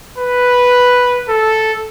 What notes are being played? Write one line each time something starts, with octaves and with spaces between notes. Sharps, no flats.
B4
A4